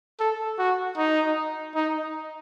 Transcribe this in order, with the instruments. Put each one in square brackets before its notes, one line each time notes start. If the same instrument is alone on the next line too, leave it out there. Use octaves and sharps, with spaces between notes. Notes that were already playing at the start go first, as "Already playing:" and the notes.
[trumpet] A4
F#4
D#4
D#4